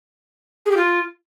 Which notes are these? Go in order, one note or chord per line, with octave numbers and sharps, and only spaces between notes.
G#4
G4
F4